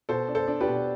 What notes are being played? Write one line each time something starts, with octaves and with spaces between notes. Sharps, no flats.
B2 A4 C5
D4
A4 C5
D4
G4 B4
B2